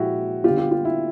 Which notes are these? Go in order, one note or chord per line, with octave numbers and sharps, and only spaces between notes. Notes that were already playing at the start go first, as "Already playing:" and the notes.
Already playing: A#2 F3 G#3 E4 F#4 G4
D3 G3 B3 F4 G4
F4 G4
F4
E4